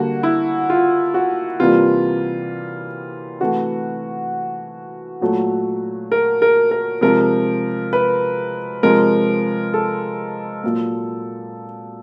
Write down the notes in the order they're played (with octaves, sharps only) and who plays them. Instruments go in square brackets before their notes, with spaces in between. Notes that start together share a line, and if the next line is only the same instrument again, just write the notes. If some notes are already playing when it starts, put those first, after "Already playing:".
Already playing: [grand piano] D3 G3 A#3 F#4
E4
F4
F#4
C3 E3 G3 A#3 F4
C3 E3 A3 F#4
A#2 F#3 A3
A#4
A#4
A#4
C3 F3 G#3 A#4
B4
C3 F3 G#3 A#4
A4
A#2 F#3 A#3